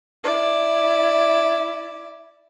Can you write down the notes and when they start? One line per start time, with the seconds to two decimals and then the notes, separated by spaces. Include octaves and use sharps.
0.24 E4 D5